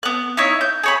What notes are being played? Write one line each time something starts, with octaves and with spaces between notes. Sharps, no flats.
B3 F#6
D#4 E4 C#5
G6
G#4 C#5 B5